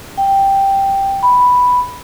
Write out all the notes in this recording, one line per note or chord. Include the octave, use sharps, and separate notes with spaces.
G5
B5